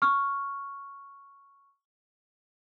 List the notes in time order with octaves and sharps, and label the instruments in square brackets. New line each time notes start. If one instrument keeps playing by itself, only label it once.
[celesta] C#6 F6